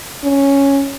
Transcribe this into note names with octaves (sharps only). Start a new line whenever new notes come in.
C#4